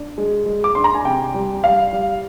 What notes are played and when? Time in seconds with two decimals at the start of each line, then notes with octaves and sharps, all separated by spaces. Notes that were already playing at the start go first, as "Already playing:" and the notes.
Already playing: D4
0.18 G#3
0.46 G#3
0.64 D6
0.75 D4 C6
0.84 A#5
0.95 G#5
1.05 C3 G5
1.34 G3
1.64 G3 F5
1.93 G3